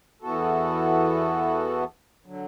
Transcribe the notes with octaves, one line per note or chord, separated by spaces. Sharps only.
E2 E3 B3 F#4 A4
D3 F#3